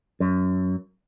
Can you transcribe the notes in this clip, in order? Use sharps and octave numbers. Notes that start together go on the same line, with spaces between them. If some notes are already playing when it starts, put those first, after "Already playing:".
F#2